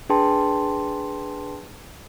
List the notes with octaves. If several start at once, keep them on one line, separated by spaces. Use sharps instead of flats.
D4 G#4 B4 G5 A5 C6